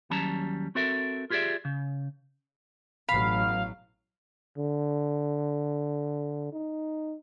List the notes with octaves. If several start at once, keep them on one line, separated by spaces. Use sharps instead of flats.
D#2 F#3 G3 C#4 A5 A#5
C4 F#4 A4 A#4 E5
F4 G4 G#4 B4 D5 E5
C#3
A1 B2 F#3 F5 B5
D3
D#4